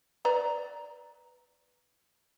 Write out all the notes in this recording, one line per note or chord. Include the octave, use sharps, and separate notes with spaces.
B4 D5 A#5